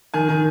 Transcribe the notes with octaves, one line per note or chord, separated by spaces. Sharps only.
D#3 G#5
D#3